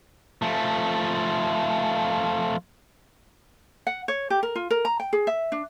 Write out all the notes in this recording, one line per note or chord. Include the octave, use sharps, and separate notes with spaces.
F3 A3
F#5
C#5
G4
A#4
F4
A#4
A#5
G5
G#4
E5
D4